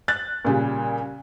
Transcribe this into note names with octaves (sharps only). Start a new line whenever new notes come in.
F#6 A6
A#2 C#3 G3